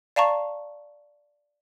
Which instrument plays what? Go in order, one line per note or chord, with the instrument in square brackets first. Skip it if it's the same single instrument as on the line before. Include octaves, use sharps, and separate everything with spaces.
[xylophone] D5 F5 A5 A#5 C#6